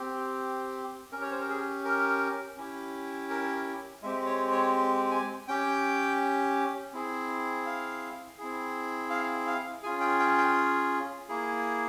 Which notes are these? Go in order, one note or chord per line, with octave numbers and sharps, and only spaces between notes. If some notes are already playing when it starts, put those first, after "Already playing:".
Already playing: C4 G4
C#4 G4 A#4
C#5
C5
A#4
G#4
A#4
C#4 E4 G4
A#4
A#4
G#3 C4 G4 E5
C#5
C#5
G#5
C#4 G4 G5
C4 E4 G#4
F5
C4 E4 G#4
F5
F5
C#4 F4 G#4 G#5
G5
G5
G5
A#3 E4 G#4